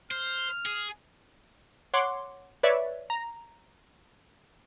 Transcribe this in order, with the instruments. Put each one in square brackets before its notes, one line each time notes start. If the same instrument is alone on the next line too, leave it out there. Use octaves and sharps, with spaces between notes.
[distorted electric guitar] C5 [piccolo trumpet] F6
[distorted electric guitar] G#4
[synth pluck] C#5 F#5 C6 D6
B4 C#5 D5 E5
A#5